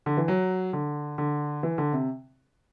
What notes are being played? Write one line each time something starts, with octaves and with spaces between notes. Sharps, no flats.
D3
E3
F#3
D3
D3
E3
D3
C3